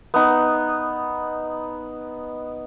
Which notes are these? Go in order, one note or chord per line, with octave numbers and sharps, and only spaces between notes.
B3 D#4